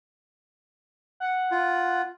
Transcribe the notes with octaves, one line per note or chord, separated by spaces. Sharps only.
F#5
F4